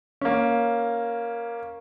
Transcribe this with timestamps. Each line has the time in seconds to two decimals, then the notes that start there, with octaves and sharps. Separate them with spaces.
0.21 A#3 C#4